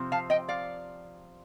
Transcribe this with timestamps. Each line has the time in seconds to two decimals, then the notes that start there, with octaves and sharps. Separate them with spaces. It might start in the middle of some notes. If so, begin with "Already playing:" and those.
Already playing: C3 F3 C4
0.12 F5 A5
0.30 D#5 G5
0.48 D5 F5